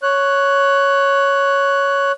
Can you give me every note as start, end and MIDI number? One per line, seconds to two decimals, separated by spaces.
0.03 2.12 73
0.03 2.12 90